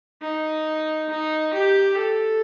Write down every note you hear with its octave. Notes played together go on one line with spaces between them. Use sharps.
D#4
D#4
G4
A4